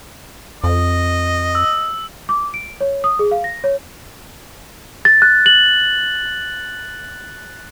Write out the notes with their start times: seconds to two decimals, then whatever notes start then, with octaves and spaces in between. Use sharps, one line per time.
0.64 F2 D#5
1.55 E6
2.29 D6
2.54 D7
2.81 C#5
3.04 D#6
3.19 G#4
3.31 F5
3.44 A#6
3.64 C#5
5.05 A6
5.22 F#6
5.46 F#7